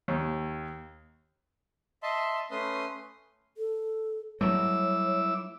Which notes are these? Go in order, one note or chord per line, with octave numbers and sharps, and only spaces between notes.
D#2
D#5 E5 A5 C6
A3 C#4 B4 C6 D#6
A4
F#3 G3 A3 E4 C#5 D6 E6